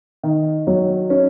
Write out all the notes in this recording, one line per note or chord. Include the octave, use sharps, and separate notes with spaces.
D#3
F#3
C#4